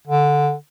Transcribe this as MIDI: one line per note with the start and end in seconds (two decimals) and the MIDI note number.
0.08 0.54 50